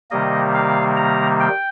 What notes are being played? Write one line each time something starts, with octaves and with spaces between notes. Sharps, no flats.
C3 D#3 G3 A#3 D#5
F5
A#5
G5